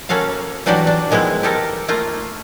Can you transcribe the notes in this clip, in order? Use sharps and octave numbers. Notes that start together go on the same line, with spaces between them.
A#3 C#4 F#4 A4 F5
E3 F#3 D4 F#4 G4 D5
D4
D#3 F3 G#3 B3 C4 E4
G4 A4 A#4
A3 A#3 F4